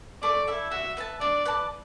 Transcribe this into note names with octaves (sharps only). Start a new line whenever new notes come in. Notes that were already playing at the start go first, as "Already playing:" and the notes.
A3 D5
E4 A4 E5
F#4 E5
B4 E5 A5
D4 D5
B4 D5 A5